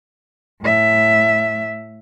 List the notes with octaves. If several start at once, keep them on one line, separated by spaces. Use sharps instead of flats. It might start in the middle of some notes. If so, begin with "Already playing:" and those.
A2 E5